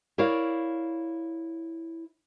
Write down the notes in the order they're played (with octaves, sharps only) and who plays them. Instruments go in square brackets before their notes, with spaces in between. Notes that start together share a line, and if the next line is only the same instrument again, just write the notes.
[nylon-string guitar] E4 A#4 C#5 D5 F5